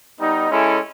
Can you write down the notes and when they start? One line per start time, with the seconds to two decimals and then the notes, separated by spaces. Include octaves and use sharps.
0.19 G3 B3 D#4
0.49 G#3 C#4 E4 A4